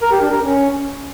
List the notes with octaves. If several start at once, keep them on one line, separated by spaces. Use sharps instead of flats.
A#4
G4
D4
A#4
C#4